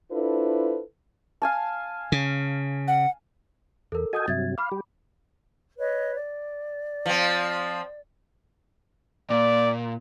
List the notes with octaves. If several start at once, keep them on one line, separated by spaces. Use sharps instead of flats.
D4 E4 F4 A4 B4 C5
F5 G#5 A5
C#3
F#5
E2 A4 A#4
F#4 A4 D#5 G#5 D#6 G6
G2 C3 F#3 E5 G#6 A6
F5 B5 D6
G3 G4
B4 C#5 D#5
D5
F3 C4
A#2 D5